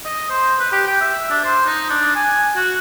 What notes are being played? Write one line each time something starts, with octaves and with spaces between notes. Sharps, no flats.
D#5
C5
B4
G4
G5
E5
D4
C5
D#4
D4
G#5
F#4